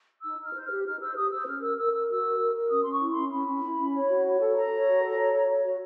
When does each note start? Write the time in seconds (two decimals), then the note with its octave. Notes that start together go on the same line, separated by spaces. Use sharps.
0.22 D#4 E6
0.37 D#4
0.43 F6
0.53 C5
0.63 F6
0.68 G4
0.84 D#4 F6
0.99 C5 E6
1.15 G4 D#6
1.30 C5 E6
1.46 C#4 F6
1.61 A#4 E6
1.77 A#4 E6
1.92 A#4 E6
2.08 F#4 E6
2.23 A#4
2.39 A#4
2.54 A#4
2.69 C#4 D#6
2.82 C#4 C6
2.91 C#6
3.01 E4
3.10 C6
3.16 C#4
3.31 C#4 B5
3.46 C#4
3.63 E4
3.78 C#4
3.93 C#5
4.09 F#4
4.24 C#5
4.40 A4
4.55 A4 A#5
4.71 C#5
4.86 F#4
5.01 A4
5.17 C#5
5.33 C#5
5.48 C#5
5.63 F#4